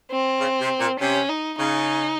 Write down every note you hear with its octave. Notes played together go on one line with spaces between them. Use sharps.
C4
C#3
C3
A#2
C3 C#4
D#4
C#3 D#4